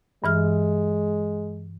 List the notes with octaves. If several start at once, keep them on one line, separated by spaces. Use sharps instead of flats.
G2 E3 G#3 F6